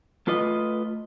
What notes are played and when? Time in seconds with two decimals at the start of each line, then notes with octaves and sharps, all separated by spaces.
0.27 A3 F4 B4 D#5